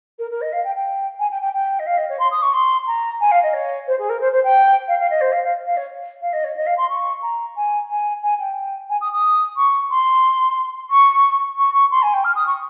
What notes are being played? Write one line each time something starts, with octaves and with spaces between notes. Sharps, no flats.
A#4
A#4
D#5
F5
G5
G5
G#5
G5
G5
G5
D#5
F5
D#5
C#5
C6
D#6
C#6
C6
A#5
G#5
F5
D#5
C#5
C5
G#4
A#4
C5
C5
G5
F5
F5
D#5
C5
F5
F5
F5
C#5
F5
D#5
C#5
D#5
F5
C6
C#6
A#5
G#5
G#5
G#5
G5
G#5
D#6
D#6
C#6
C6
C#6
C#6
C#6
C6
G#5
G5
F6
D#6
C#6